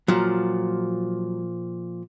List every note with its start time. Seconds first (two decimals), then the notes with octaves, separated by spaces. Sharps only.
0.08 A#2 F3 F#3